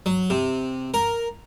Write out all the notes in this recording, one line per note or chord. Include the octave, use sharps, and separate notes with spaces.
F#3
C3
A#4